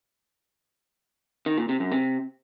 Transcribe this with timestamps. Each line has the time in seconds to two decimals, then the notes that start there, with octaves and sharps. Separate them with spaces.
1.46 D#3
1.58 A#2
1.69 C3
1.80 F#2
1.92 C3